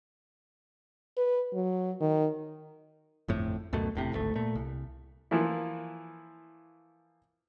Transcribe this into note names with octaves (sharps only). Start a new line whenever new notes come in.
B4
F#3
D#3
G1 F2 A2
C#2 F#2 B2 A3
E1 A2 C3
D1 G#1 D2 A3
A#2 A3
C2
E3 F3 A#3 E4